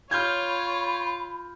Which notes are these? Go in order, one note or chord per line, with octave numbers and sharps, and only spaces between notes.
F4 C#5 B5 F6 G6 G#6